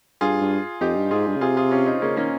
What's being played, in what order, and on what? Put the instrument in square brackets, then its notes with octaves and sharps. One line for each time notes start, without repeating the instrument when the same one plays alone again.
[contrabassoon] G2 [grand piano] F4 G#4
[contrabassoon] G2
[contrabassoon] F2 [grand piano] D#4 G4
[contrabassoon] G2
[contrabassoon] G#2 [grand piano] F4 G#4
[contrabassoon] G2
C#3
[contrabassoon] C3 [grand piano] F4 G#4
[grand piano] F4 G#4
C#4 F4
C4 D#4
[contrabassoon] C#3 [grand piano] A#3 C#4
[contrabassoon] D#3 [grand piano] A#3 C#4